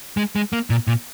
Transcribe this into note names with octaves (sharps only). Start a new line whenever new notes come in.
G#3
G#3
A#3
A#2
A#2